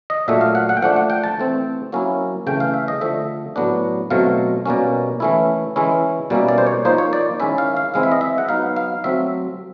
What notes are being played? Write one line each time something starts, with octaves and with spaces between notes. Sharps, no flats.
D#5
A#2 F#3 A3 D4 E5
F5
F#5
F#5
G5
F3 A3 D4 F#5
F#5
G5
A5
E3 A3 C4
F#3 A#3 C#4 E4
C#3 E3 A3 C#4 G5
F5
E5
D#5
D3 F3 A3 E5
A2 F#3 B3 D4
B2 F#3 A3 C4 F5
B2 G3 A#3 C#4
E3 A3 C#4 E4
E3 G#3 C#4 E4
B2 G3 A#3 C#4 E4
D5
C5
C#5
F3 A#3 D#4 C5
C#5
D5
D#3 G#3 C#4 E4 E5
F5
F5
E3 G#3 C4 E4 F5
E5
D#5
E5
F#5
F#3 B3 D#4 F5
F5
F#3 A3 C4 E5